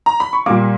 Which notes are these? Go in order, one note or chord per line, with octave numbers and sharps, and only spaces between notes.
A#5
B5
C#6
A#2 G3 A#3 D6